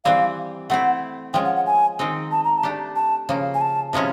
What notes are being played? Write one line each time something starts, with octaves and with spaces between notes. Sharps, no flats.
E3 G3 C4 F5
A3 C4 E4 F#5
F3 G#3 C#4 G5
F#5
F#5
G#5
D#3 G#3 C4 D#4
A5
A#5
A5
A3 D4 G4
A5
C#3 F3 A#3
G#5
A5
C3 F3 G#3 C#4 E4